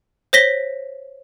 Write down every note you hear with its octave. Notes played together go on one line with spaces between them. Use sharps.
C5 C#5 A#6 B6 G7